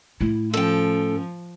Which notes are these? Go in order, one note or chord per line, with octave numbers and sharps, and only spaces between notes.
A2 E4
F3 C#4 A4 G5